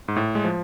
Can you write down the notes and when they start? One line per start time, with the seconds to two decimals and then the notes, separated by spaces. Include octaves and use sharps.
0.08 G#2
0.16 A2
0.35 G#3
0.44 F3